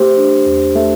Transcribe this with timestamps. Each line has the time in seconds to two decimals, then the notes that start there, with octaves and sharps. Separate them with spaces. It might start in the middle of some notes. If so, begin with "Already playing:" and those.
Already playing: A3 G4 C5
0.17 D4
0.46 E2
0.75 A3